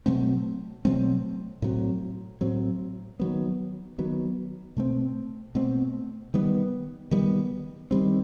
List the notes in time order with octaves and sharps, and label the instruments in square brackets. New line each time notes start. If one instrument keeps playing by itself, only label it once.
[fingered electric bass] B2 F#3 A3 C4
B2 F#3 A3 C4
A2 F#3 C4
A2 F#3 C4
D#3 F#3 B3
D#3 F#3 B3
B2 A3 C4
B2 A3 C4
D#3 G3 B3
D#3 G3 B3
D#3 G3 C4